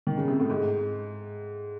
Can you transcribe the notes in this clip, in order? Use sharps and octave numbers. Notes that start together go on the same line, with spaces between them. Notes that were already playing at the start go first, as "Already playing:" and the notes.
D#3
C#3
C3
A2
G#2